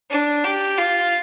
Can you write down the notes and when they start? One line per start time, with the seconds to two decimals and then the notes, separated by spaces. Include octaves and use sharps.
0.11 D4
0.44 G4
0.78 F4